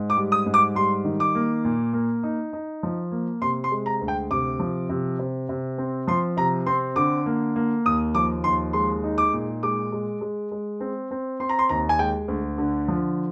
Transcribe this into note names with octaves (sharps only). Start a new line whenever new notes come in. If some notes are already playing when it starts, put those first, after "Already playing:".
Already playing: G#2
D6
G3
D#6
G#2
D6
G3 C6
D#3
D6
A#3
A#2
A#3
D#4
D#4
F3
A#3
C3 C6
C6
G#3
A#5
D2
G5
C3 D6
F3
C3
C3
C3
C4
F3 C6
C3 A#5
C4 C6
D3 D6
A#3
A#3
D#2 D#6
F3 D6
D#2 C6
G#3 C6
D#4
D6
A#2
G#3 D6
G#3
G#3
G#3
C4
C4
C4 C6
A#5
C6
D#2 A#5
G#5
G#3 G5
D2
D3
F3